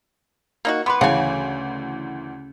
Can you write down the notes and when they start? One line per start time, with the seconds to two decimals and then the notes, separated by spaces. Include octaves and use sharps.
0.65 A#3 D#4 F#4
0.86 B3 B4 C6 D6
1.01 D2 C#3 E3 F#5 G#5